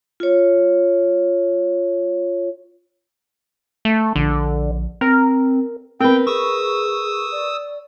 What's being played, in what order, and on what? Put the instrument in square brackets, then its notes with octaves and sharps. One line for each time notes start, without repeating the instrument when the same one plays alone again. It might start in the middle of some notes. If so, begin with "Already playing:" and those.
[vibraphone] F4 C#5
[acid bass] A3
[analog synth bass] A#1 [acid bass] D3
[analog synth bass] C4 [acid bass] A#4
[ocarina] B3 [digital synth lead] C4 [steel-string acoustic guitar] A#4 B4 [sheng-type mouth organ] G5
[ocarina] G#4 [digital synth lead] C#6 [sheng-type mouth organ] D#6 E6
[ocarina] D5